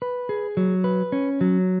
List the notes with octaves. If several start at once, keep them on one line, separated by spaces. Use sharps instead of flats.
B4
G#4
F#3
B4
C#4
F#3